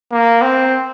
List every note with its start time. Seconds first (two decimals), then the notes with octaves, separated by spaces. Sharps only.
0.12 A#3
0.42 C4